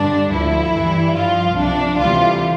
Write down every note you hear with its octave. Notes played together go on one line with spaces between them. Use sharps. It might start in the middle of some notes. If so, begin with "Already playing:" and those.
Already playing: G2 D3 G3 D4
D2 D3 F3 E4
G2 E3 G3
G2 F3 F4
C2 C3 F3 D4
D2 C3 E3 G3 F4